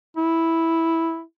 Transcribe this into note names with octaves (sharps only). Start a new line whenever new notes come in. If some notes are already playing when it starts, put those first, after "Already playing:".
E4